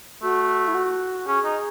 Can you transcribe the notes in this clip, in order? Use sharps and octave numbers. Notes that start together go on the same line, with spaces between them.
A3 F#4
E4
F#4
C#4 G#4
D#4